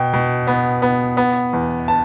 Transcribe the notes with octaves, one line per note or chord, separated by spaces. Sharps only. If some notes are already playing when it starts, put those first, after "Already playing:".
Already playing: B2 G5
B2
B3
B3
B3
E2
A5